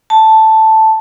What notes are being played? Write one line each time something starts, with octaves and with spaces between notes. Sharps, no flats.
A5